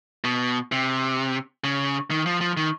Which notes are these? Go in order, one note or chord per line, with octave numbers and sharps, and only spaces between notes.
B2
C3
C#3
D#3
F3
F3
D#3